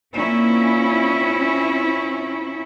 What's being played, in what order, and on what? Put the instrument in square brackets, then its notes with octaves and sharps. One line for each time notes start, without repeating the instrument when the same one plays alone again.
[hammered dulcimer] A#2 A#3 [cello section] C4 C#4 E4